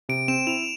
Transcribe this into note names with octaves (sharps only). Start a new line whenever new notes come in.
C3 D7
C4 E7
E4 F7